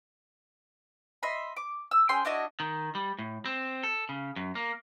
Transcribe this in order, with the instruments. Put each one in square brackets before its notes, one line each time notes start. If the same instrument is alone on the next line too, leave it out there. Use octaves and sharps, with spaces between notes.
[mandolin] D#5 E5 B5 C6
D6
E6
C#4 G#4 G5 C6
D4 E4 F#4 D#5
[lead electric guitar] D#3
G3
A2
C4
A4
C#3
F#2
A#3